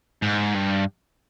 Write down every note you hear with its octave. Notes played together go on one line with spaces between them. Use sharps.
G#2
G2